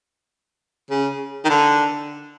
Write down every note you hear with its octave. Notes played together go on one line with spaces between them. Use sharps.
C#3
D#3
D3